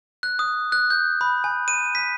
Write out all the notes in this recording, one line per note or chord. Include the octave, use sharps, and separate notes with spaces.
F#6
D#6
F#6
G6
B5
G#5
D#7
B6